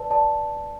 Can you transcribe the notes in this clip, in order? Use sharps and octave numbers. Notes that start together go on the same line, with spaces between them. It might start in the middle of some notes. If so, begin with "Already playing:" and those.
Already playing: B4 D5 A5
D5 A5